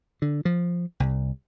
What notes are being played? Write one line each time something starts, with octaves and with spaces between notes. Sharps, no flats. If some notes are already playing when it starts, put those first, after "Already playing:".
D3
F3
C2